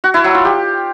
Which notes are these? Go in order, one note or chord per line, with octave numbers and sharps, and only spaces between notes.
F#4
E4
F#3
F4
G4